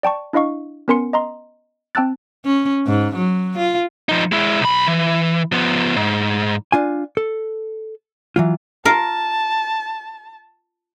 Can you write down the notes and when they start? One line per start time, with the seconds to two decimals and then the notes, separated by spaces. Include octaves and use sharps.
0.03 D5 G5 A5 C#6
0.33 D4 E4 D#5 F5 C#6
0.88 B3 C#4 A#4 G#5 C6 C#7
1.13 D#5 A#5 C6
1.95 C4 G5 A5 E6 F#6 A6
2.45 C#4
2.87 G#2
3.16 F#3
3.58 F4
4.09 F3 D#4
4.32 G#3 E4
4.61 B1 B5
4.88 E3
5.52 F3 B3
5.96 G#2
6.72 D4 F4 G#5
7.17 A4
8.36 E3 F#3 F4
8.85 F4 A#4 A5